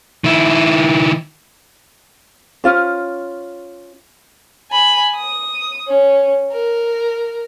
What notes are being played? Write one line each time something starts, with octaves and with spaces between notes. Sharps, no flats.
D#3 E4
C#4 F4 C5
G#5 B5
D#6
C#4
A#4